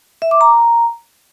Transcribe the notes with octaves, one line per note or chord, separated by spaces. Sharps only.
E5
D6
A#5